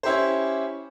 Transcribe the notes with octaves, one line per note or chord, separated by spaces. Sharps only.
C#4 E4 G4 C5